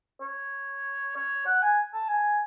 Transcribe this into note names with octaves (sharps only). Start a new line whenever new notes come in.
C#5
C#5
F#5
G#5
A5
G#5